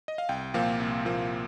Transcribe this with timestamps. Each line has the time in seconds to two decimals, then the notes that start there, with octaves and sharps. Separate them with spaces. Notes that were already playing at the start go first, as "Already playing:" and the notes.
0.08 D#5
0.18 F5
0.29 C2 G5
0.54 A#2 F3 A#3 F5
0.80 C2
1.05 A#2 F3 A#3